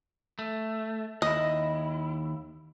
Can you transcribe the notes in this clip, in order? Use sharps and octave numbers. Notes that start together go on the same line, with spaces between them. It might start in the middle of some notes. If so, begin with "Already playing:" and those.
A3
D#2 E4 D#5